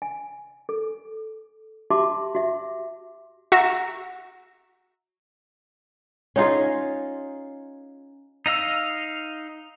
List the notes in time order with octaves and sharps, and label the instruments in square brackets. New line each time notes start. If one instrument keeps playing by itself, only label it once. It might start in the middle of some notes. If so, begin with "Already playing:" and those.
[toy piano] G#5
A4
F#4 G4 E5 A5 C6 D6
F#4 E5
[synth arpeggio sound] F#4 E5 A#5
[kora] C#4 D#4 F4 G#4
[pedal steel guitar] D#4 D#5 F5 E6